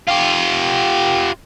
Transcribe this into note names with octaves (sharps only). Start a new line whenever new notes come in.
F4 G4